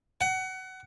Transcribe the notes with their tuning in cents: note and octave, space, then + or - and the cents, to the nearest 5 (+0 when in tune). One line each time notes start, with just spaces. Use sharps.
F#5 +25